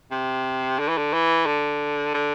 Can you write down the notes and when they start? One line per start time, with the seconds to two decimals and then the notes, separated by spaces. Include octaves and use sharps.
0.11 C3
0.79 D3
0.88 E3
0.97 D3
1.13 E3
1.46 D3
2.14 D3